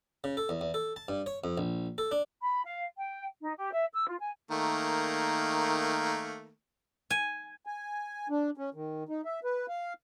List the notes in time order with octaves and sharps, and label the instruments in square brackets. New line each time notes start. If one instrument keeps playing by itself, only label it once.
[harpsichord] C#3
A4
E2
E2
A4
A5
G2
C#5
F2
A#1
A4
D4
[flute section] B5
F5
G5
D#4
G4
E5
E6
F4
G#5
[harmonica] D#3 A3 A#3
[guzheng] G#5
[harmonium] G#5
D4
C#4
D#3
D#4
E5
B4
F5